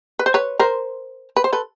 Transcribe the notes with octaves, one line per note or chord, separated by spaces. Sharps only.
B4
C5
B4 C#5
A#4 C5
B4
C5
A4 B4